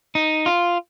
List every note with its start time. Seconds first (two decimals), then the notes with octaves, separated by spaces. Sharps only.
0.15 D#4
0.46 F4